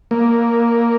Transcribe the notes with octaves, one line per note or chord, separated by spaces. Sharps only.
A#3